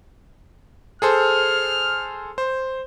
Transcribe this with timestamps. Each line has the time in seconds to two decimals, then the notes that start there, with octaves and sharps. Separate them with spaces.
1.02 G#4 A4 C5 F6
2.38 C5